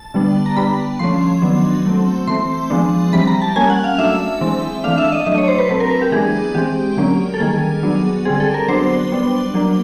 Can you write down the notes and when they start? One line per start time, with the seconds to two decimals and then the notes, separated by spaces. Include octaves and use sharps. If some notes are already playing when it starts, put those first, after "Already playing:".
Already playing: A5
0.14 D3 G3 B3 D4
0.46 A#5
0.56 G3 B3 D4 B5
0.99 F3 A3 C#4 C6
1.42 D#3 F#3 B3 D4
1.85 F#3 A3 C4
2.27 E3 A3 C4 C6
2.70 F3 G#3 B3 D4
3.13 E3 G3 C4 B5
3.27 A#5
3.42 A5
3.56 G3 A#3 C#4 G#5
3.70 F#5
3.84 F5
3.98 F#3 A3 D4 E5
4.41 E3 G#3 C4
4.84 E3 A3 D4 F5
4.98 E5
5.12 D#5
5.26 F#3 A3 D4 D#5
5.38 C#5
5.48 C5
5.58 B4
5.69 F#3 A3 C4 B4
5.80 A#4
5.90 B4
6.02 G4
6.12 E3 G#3 B3 D4 G#4
6.55 E3 G#3 C4 G4
6.97 D3 F#3 A#3 C#4
7.34 A4
7.40 D#3 G3 A#3 G#4
7.83 F#3 B3 D4
8.25 D3 G3 C4 G#4
8.40 A4
8.54 A#4
8.68 F#3 B3 D4 C5
9.12 G3 B3 D4
9.54 F#3 A#3 D4